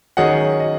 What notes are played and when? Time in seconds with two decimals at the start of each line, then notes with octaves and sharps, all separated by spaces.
0.17 D#3 F#3 C#4 G#4 D#5 F#5
0.60 D#5